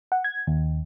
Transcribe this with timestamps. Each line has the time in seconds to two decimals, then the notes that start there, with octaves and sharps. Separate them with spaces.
0.12 F#5
0.24 G#6
0.47 D#2